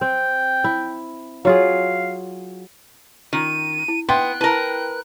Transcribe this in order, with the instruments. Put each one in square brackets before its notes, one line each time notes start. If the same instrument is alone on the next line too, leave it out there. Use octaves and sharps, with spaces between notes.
[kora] C4 [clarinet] G5
[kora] E4
[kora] F#3 F4 G#4 [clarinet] F5
[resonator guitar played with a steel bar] D#3 [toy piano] C#4 F4 [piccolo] D#7
[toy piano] E4
[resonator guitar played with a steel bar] B3 [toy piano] E5 [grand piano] G5 C6 [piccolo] F#6
[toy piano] E4 A5 [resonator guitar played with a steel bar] A#4 B4